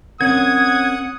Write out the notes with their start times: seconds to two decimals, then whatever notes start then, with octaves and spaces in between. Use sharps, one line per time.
0.21 C4 C#4 A#4 F#5 D#6 G#6